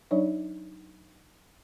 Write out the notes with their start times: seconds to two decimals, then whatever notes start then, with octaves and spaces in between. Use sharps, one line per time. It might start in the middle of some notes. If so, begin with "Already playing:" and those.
0.11 F#3 D4 D#4 C#5 D5